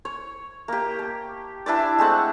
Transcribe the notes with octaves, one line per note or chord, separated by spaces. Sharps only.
C#5
A#3 G4
A5
D4 E4 B4 D5
G#3 A3 C4 F#5